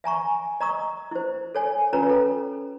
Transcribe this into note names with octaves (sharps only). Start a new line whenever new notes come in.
E5 G#5 A#5 C#6
D#5 A#5 C#6 D#6
E4 C5
A4 C#5 G#5
C#4 F4 B4 C#5 A#5
A4